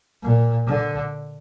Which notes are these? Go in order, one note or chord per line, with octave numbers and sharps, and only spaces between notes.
A#2
D3